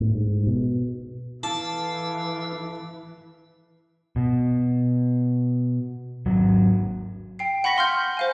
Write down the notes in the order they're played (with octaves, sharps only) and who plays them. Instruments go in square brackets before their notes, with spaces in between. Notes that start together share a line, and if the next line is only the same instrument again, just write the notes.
[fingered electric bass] A2
G#2
B2
[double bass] E3 [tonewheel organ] E4 [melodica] A4 F5 D6 [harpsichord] A5
[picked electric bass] B2
G#1 F#3
[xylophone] G5 C7
F#5 B5 C#6 A#6 B6 C#7
F5 C6 F6 G6
C5 F5 G#5